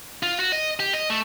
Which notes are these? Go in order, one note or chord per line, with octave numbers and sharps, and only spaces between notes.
F4
F#4
D#5
G4
D#5
A3